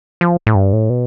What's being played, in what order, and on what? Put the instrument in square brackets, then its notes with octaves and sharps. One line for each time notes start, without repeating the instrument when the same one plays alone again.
[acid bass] F3
A2
G2
A2
B2